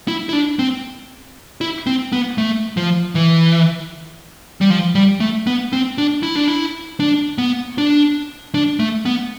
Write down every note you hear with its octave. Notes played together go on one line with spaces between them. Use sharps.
E4
E4
D4
C4
E4
C4
B3
A3
F3
E3
G3
F3
G3
A3
B3
C4
D4
E4
D4
E4
D4
B3
D4
D4
A3
B3